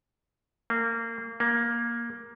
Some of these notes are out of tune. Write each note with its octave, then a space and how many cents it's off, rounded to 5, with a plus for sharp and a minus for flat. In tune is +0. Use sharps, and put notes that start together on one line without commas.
A#3 -25
A#3 +10